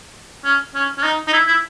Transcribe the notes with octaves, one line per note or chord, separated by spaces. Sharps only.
C#4
C#4
C#4
D#4
D#4
E4
E4